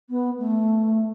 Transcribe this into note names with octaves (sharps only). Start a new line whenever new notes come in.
B3
A3